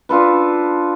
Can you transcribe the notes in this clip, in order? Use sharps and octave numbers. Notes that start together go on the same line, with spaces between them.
D4 F4 A4 B4